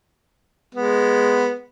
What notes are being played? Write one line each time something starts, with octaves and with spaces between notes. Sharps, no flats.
G#3 B3